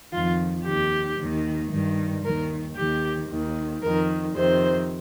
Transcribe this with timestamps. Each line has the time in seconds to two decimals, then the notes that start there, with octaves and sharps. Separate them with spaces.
0.13 F2 D#3 F4
0.65 D#2 D#3 G4
1.18 D#2 D#3
1.72 G2 D#3
2.24 D#2 D#3 A#4
2.76 D#2 D#3 G4
3.29 D#2 D#3
3.82 F2 D#3 A#4
4.35 F2 C3 D#3 C5